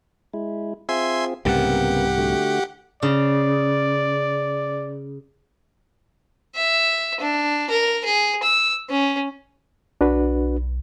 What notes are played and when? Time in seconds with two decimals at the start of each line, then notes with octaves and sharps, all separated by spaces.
0.34 G#3 E4
0.89 C4 F4 G#4 E5 G#5 C6
1.45 C2 G#2 C#3 A#3 B3 G4 F#5
2.17 D3 A3 F#4
3.03 C#3 D5
6.55 E5
7.20 D4
7.70 A#4
8.05 G#4
8.43 E6
8.89 C#4
10.01 B1 D4 F#4 B4